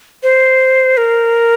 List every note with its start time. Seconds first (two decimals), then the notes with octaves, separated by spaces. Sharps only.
0.23 C5
0.97 A#4